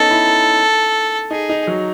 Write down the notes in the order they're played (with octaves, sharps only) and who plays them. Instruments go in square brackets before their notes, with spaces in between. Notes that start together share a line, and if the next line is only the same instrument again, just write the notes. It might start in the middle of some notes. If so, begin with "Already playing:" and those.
Already playing: [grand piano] B3 C#4 D#4 [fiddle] A4
[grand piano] E4
[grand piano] D#4 [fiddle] G#4
[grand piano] D#4
F#3